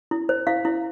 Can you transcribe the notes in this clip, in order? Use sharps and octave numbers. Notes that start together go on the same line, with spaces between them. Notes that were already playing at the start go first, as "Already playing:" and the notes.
E4
C5
E4 F5
E4